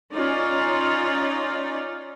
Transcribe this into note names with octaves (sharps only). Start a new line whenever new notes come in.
C#4 D#4 F4 D5